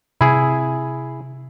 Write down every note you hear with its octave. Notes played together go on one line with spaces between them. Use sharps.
C3 E4 G#4